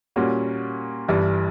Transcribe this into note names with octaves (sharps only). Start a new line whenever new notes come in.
A#2 G3 A#3 C#4 F#4
G1 G2 E3 G3